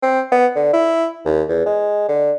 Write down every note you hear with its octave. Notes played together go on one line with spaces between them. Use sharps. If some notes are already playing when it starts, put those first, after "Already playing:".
C4
B3
D3
E4
D#2
E2
G#3
D3